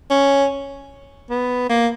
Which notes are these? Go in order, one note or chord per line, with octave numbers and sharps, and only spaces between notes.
C#4
B3
A#3